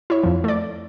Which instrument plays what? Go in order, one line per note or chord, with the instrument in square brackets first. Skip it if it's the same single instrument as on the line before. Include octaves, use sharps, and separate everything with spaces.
[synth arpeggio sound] E4 C#5
F2 F3
A3 D5